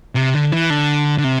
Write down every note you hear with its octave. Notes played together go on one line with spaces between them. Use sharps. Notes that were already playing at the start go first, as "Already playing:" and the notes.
C3
D3
E3
D3
D3
C3